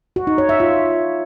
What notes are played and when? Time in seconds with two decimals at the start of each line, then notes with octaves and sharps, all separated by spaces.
0.16 F#4
0.27 D#4
0.38 C#5
0.49 E5
0.60 F4